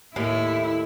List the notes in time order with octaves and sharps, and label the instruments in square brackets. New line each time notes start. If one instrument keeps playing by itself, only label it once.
[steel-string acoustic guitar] D#2 A2 [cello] E4